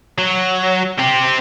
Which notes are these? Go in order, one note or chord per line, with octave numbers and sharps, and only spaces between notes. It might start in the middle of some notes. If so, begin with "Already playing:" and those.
F#3
C4 G4